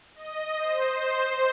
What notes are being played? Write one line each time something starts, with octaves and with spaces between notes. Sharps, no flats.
D#5
C5